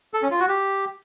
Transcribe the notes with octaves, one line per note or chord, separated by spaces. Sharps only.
A4
C#4
F4
F#4
G4